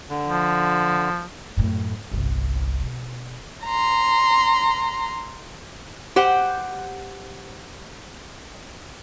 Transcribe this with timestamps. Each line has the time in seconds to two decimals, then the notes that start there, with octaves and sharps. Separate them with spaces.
0.10 D3
0.29 F3
1.57 F#2 A2
2.11 G1 C2
2.83 B2
3.65 A#5 C6
6.16 G4 C5 F#5